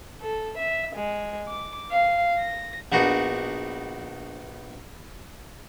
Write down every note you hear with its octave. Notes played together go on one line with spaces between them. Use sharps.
A4
E5
G#3
D6
F5
A#6
A#1 B3 D4 D#4 F#4